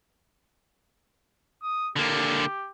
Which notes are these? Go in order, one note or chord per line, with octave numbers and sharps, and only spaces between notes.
D#6
D3 A#3 G4